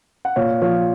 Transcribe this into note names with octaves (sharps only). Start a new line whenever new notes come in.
F#5
A#2 C#5 F5
F3 C#5 F5